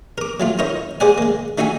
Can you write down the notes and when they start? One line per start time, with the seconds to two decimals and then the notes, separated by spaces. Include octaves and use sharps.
0.18 A#4 D6
0.40 F#3 A3 F4
0.59 E4 A#4 C5 C#5 D#5
1.00 G#3 G#4 C5 D5 F#5 G#5
1.18 G#3 A#3
1.58 A3 D4 D#4 F#4 E5 G#5